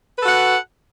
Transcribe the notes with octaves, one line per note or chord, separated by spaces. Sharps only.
F#4 A4 B4 F#5